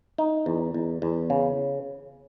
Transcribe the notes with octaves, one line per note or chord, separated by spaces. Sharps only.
D#4
E2
E2
E2
C#3